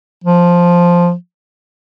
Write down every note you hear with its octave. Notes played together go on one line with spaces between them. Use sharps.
F3